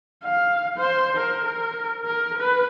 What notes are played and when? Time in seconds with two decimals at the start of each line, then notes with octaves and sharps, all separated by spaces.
0.24 F5
0.78 C5
1.17 A#4
1.45 A#4
2.05 A#4
2.38 B4